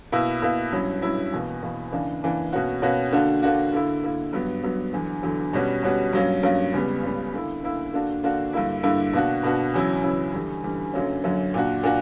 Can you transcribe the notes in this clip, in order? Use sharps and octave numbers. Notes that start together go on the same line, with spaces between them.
B2 A#3 E4
B2 A#3 E4
G2 F#3 C#4 E4
G2 F#3 C#4 E4
E2 B2 A#3
E2 B2 A#3
C#3 E3 A#3 D4
C#3 E3 A#3 D4
B2 A#3 C#4 F#4
B2 A#3 C#4 F#4
D3 A#3 D4 F#4
D3 A#3 D4 F#4
D3 A#3 E4
D3 A#3 E4
G2 F#3 B3
G2 F#3 B3
E2 D3 F#3
E2 D3 F#3
B2 G3 C#4 F#4
B2 G3 C#4 F#4
G2 F#3 A#3 C#4
G2 F#3 A#3 C#4
C#2 C#3 G3 B3
C#2 C#3 G3 B3
D3 A#3 E4
D3 A#3 E4
D3 A#3 D4 F#4
D3 A#3 D4 F#4
G2 D3 A#3 E4
G2 D3 A#3 E4
B2 A#3 D4 F#4
B2 A#3 D4 F#4
E2 C#3 F#3 C#4 E4
E2 C#3 F#3 C#4 E4
E2 D3 G3
E2 D3 G3
F#2 D3 F#3 A#3 C#4
F#2 D3 F#3 A#3 C#4
A#2 A#3 D4 F#4
A#2 A#3 D4 F#4